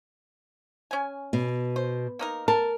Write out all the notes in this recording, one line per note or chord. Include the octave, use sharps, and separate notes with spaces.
C#4 G#5
B2
C5
A#3 D#4 A#4
A#4 A5